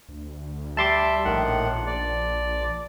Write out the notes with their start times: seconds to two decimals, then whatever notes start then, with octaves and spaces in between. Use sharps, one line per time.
0.09 D2
0.77 G3 E5 A5 C6 D6
1.25 A#1 A2 D#3 F#5
1.87 D5